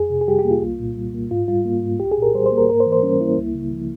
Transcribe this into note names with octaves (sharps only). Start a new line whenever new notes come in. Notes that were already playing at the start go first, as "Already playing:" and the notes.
Already playing: F2 G#4
C3
G#4
G3 G4
G4
A#3
F4
C2
A#2
G3
A#3
G#2 F4
G3 F4
A#3
G#2
C2 G4
G#4
A#2 A#4
G3 C5
C5
A#3
A#4
G#2 A#4
C5
E3
C5
G3 C#4
A#3 E4
C#2
C#3
F3